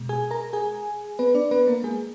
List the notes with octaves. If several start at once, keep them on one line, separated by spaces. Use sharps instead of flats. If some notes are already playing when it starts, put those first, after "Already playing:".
Already playing: B2 G#3
G#4 G#5
A#4 A#5
G#4 G#5
B3 B4
D4 D5
B3 B4
A#3 A#4
G#3 G#4